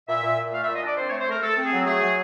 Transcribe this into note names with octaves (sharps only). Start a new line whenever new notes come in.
A#2 E5
A#2
A#2
A3 F5
E5
A#2
D#5
D4 D5
C4 C5
C#5
A3
C5
A3 A#4
A3 A4
C4
G#4
F#3
A3 G#4
F#3